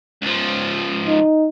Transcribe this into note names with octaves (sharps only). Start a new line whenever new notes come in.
C#2 F3
D#4